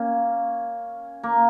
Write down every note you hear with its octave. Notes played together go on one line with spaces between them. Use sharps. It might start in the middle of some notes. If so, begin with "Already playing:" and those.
Already playing: A#3 C#4
A#3